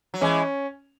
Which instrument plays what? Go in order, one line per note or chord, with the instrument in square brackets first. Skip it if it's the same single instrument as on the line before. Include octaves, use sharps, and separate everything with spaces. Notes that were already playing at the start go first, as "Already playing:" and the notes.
[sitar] F#3
[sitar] E3 G#3 [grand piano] C#4